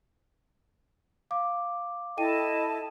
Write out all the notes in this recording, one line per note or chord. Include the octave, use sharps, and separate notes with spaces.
F5 D6
E4 A4 D#5 G5 A5 D#7